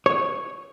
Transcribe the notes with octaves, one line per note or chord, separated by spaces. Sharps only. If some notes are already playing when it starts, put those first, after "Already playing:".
C#5